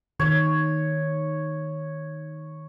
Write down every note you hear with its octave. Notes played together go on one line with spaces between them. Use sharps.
D#3 C#5